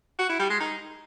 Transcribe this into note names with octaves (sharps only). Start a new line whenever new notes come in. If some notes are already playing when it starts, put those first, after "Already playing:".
F#4
E4
G3
G#3
D#4